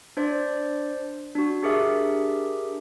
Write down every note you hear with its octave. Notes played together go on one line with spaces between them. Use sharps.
D4 C5 D5
D4 F#4
D4 G4 G#4 A#4 E5